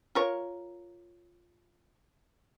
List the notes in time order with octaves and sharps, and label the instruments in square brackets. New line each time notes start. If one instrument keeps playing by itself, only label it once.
[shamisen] F4 A#4 C#5